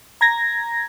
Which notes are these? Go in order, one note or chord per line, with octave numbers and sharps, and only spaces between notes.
A#5 G#6 A#6